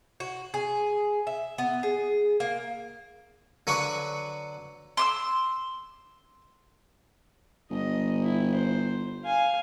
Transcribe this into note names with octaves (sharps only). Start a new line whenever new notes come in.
F#4
G#4
E5
B3
G#4
A#3
D3 F#3 B4 F#5 B5 C#6
C6 D6 E6
G1 D#5
E4
C5
F5 G#5